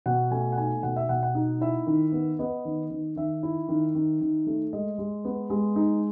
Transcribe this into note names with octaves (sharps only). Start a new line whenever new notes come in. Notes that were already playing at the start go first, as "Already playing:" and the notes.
B2 F#5
A3 G#5
F#5
D#4 G#5
B2 F#5
E5
B2 F#5
F#5
D#4
E4 E5
D#3
B3
B3 D#5
D#3
D#3
D#3 E5
E4
D#3
D#3
D#3
A3
G#3 D#5
G#3
B3
G#3
D#4